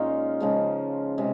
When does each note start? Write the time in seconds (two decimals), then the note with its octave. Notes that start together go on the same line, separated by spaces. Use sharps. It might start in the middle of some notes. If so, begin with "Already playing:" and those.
Already playing: A#2 G#3 C#4 D#4 F4
0.40 C#3 F3 G#3
1.18 C3 G#3